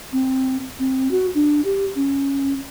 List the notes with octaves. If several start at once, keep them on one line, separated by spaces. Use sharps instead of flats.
C4
C4
F#4
D4
G4
C#4